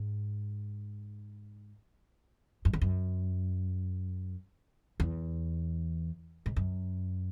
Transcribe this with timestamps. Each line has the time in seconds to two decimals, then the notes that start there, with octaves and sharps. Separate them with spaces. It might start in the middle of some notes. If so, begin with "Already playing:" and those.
Already playing: G#2
2.65 F#2
2.73 E2
2.81 F#2
5.00 E2
6.46 G#2
6.56 F#2